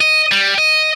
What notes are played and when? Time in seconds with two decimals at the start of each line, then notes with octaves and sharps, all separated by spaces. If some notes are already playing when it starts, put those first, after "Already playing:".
0.01 D#5
0.32 G3
0.58 D#5